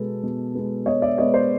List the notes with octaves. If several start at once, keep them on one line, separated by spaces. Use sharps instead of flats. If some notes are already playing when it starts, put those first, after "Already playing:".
Already playing: B2 G#3 B3 A4
B2
G#3 B3
B2 C#5 D#5
D5 E5
G#3 B3 C#5 D#5
C5 D5